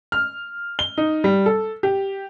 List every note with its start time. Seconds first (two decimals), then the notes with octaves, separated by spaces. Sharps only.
0.12 F6
0.79 G7
0.98 D#4
1.24 G3
1.46 A4
1.83 G4